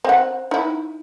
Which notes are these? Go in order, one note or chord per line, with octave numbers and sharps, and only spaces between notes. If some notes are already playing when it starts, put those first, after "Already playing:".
C4 F#5
D#4 E4